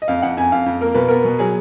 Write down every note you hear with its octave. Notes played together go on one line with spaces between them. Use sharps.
D#5
F2 F5
F2 F#5
F2 G#5
F2 F5
F2
A#3 A#4
B2 B4
B3 A#4
B2
F#3 G#4